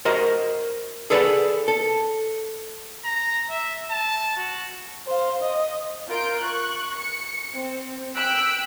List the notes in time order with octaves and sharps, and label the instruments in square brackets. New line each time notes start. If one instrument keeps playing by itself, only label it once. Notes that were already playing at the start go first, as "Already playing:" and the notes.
[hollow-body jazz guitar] F#4 A#4 C5 D#5 A#5
G#4 A4 B4 D5 E5 F#5
A4
[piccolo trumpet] A#5
E5
A5
F#4
[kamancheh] C5 F5
D#5
[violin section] F4 A#4 G6 D7
C#6 F#6
C#7
C4
G5 E6 F#6 B6 D7